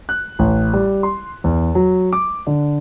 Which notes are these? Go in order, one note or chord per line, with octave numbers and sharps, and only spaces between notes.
F#6
A1
G3
C6
E2
F#3
D6
D3